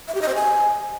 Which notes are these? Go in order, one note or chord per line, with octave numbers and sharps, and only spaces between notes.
E5
G4
D#5
C5
G#5